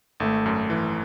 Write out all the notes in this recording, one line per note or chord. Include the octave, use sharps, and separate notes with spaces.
G#1 A3
F#2
E3